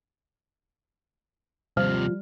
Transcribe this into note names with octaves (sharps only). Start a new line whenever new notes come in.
D#2 C3 F3 G3 F6